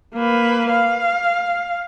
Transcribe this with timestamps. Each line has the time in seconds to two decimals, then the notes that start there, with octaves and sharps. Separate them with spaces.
0.14 A#3 B4
0.71 F5